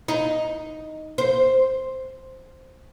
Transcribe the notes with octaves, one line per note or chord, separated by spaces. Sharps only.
D#4
C5